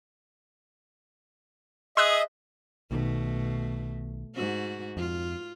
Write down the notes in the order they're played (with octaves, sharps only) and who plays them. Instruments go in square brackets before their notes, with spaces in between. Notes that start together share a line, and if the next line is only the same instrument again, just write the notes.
[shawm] G#4 [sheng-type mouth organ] D#5 E5 [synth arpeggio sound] C6 E6 F#6
[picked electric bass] B1 D#3 [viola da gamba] B2 A3
[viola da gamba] G#2 F#4
[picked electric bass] F2 [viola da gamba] F4